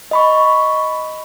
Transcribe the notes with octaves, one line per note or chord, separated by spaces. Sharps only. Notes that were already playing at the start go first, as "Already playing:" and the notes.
D#5 B5 C#6